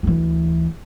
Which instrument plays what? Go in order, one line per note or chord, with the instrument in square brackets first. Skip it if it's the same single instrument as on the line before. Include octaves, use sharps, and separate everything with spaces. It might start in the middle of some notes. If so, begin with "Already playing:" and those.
[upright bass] D2 E3